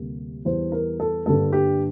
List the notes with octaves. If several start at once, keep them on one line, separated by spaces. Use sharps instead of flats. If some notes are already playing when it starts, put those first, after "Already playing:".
Already playing: D2 C3 G3 A#3
E2 E3 G3 C5
A#4
A4
G2 D3 G3 A#3 A4
G4